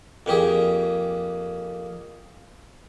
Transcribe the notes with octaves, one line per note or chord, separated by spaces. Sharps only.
F2 A#3 G4 G#4